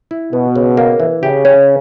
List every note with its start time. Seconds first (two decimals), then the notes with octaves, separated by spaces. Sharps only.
0.11 E4
0.32 B2 B3
0.56 C#3
0.77 A#3
1.00 E3
1.22 C#3 G4
1.45 C#4